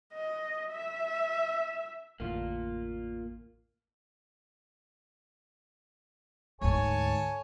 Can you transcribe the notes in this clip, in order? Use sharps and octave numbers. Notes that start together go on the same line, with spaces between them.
D#5
E5
A1 F2 D3 A#3 F4
D2 G#2 A4 C#5 G#5